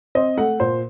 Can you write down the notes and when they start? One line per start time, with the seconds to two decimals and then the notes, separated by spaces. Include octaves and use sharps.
0.15 C4 D#5
0.37 A3 F#5
0.60 A#2 C5